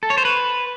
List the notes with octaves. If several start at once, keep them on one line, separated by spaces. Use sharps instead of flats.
A4
C#5
C5
B4